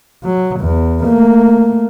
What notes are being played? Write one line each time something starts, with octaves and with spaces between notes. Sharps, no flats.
F#3
E2
A3 A#3